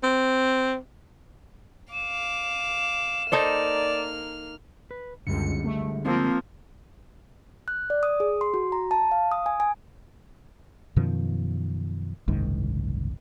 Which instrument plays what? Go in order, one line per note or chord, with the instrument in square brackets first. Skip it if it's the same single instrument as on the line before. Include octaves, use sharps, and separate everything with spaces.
[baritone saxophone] C4
[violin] F5 D6 [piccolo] E7
[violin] A#3 F6 [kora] D#4 A4 C5 [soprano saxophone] D5
[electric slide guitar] B4
[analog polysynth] C#2 F#2 C#7 [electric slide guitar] D3 G3 G#3
[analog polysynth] A3
[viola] F3 A#3 [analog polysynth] C4
[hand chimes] F#6
D5
D#6
G#4
C6
F#4
A#5
A5
F5
D#6
G#5
G#5
[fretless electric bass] F#2 B2 D#3 F3
F#1 C2 G#2 D#3